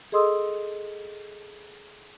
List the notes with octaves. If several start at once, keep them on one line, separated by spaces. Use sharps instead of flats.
G#4 A4 D#5 C6 D#6 E6